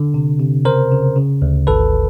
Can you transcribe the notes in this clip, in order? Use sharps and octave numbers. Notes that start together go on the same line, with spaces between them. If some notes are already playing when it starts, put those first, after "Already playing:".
Already playing: D3
C3
C3
C#3 A#4 C5
C#3
C#3
D2
G#1 A4 B4